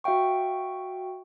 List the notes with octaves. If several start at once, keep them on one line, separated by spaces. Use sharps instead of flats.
F#4 E5 F5 G5 C#6